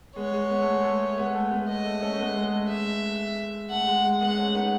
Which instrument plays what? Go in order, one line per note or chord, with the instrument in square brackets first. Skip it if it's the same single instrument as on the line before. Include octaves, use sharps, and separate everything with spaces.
[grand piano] G#3 B3 [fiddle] C#5
[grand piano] G#3
B3
A3
G#3
A3
G#3 B3
A3
G#3 B3
[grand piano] A3 [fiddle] D#5
[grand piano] A3
A3 C#4
A3
G#3 B3
G#3
A3
[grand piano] G#3 [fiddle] E5
[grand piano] A3 [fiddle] F#5
[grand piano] G#3
G#3
[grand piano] G#3 B3 [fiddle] F#5
[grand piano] A3 C#4
B3 D#4